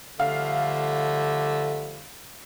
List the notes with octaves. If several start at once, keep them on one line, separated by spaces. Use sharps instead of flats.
D3 F3 G3 A3 F5